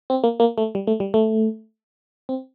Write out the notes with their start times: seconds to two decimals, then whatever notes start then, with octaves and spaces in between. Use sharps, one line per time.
0.10 C4
0.24 A#3
0.40 A#3
0.58 A3
0.75 G3
0.87 A3
1.00 G3
1.14 A3
2.29 C4